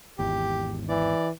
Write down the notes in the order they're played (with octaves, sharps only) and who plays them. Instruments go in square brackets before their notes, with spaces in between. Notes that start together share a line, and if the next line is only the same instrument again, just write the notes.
[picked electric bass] G#1 E2 [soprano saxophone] G4
[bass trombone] E3 [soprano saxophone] D5